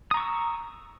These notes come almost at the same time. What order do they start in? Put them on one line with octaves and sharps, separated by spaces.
D#6 A#5 C#6 E6